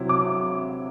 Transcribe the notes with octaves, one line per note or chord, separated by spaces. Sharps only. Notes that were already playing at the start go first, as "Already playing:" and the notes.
Already playing: C3 F#3 C4 E4
D6